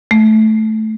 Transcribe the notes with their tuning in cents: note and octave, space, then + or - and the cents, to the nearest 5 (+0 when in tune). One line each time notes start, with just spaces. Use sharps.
A3 -10